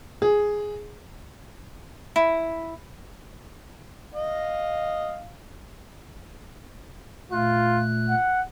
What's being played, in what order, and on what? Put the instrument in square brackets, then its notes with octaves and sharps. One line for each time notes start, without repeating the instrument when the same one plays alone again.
[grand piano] G#4
[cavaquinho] E4
[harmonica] D#5 [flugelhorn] F5
[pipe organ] A#2 A3 F#6 [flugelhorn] F4
[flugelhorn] F#5